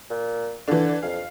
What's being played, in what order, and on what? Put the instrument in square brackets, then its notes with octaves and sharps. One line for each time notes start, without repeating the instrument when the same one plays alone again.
[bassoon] A#2
[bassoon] D3 [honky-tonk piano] E3 D4
[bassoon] F2 [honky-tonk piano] F5